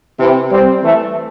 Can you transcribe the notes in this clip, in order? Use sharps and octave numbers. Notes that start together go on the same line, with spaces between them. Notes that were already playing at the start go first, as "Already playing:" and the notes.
C3 E3
G3 C4
E3 A3